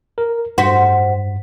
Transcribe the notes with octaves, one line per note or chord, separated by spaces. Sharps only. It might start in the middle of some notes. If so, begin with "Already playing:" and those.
A#4
G2 F#4 C5 B6